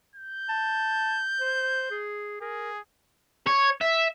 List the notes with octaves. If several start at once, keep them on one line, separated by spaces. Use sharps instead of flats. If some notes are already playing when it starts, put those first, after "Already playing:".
G6
A5
C5
G#4
G#4 A#4
C#5
E5